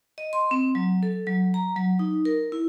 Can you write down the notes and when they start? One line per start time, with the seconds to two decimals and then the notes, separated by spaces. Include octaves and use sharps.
0.18 D#5
0.33 C6
0.51 C4
0.75 F#3
1.03 A4
1.27 F#3
1.54 A#5
1.76 F#3
1.99 D#4
2.25 A#4
2.52 E4